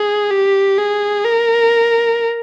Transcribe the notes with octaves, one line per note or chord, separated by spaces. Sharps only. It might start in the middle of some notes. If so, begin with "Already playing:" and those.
Already playing: G#4
G4
G#4
A#4